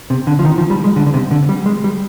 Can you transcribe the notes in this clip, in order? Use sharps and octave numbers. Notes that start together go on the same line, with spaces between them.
C3
D3
F3
D#3
F3
G3
G#3
D3
D3
C3
D3
G3
G#3
G3